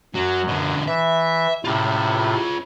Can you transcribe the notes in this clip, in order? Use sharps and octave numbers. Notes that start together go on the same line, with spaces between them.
F#2 F#3
B2 D3
E3 E5
A2 C3 C#4 F4